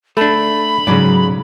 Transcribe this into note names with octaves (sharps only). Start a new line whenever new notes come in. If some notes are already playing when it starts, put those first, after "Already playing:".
A3 D4 A4 B5
G#2 C#3 F#3 D5